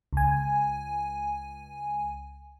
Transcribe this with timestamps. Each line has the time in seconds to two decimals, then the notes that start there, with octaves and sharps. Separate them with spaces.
0.13 C#2 G#5